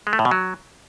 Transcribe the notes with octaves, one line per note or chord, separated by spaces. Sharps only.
G#3
A3
A2
B2
F#3